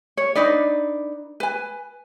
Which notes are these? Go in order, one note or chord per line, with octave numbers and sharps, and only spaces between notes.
C#5
D4 D#4 B4 D5
B4 G#5